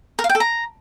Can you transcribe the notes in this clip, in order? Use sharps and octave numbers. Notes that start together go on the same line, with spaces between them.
A#4
F5
G5
A4
A#5